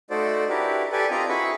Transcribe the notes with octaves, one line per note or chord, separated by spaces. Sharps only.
A3 D#4 F#4 A4 C5 D5
D4 E4 F#4 G4 A#4 B4
G4 A4 B4 D5 G#5
C4 D4 F4 D#5 A#5
E4 F#4 G#4 B4 B5 C#6